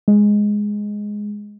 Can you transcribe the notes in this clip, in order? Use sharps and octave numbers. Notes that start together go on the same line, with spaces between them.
G#3